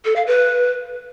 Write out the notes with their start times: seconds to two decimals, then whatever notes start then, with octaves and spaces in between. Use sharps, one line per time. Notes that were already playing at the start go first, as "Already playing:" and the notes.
0.05 A4
0.16 F5
0.27 B4